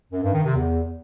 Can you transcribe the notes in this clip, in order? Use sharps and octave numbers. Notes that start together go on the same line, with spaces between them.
F#2
G2
D#3
C3
E2